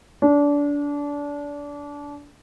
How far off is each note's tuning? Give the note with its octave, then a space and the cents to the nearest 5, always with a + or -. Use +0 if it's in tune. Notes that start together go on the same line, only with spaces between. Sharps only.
D4 -25